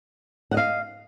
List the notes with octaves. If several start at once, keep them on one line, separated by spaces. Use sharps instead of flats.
D#5 F5 F#5